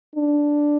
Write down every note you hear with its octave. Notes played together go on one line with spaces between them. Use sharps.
D4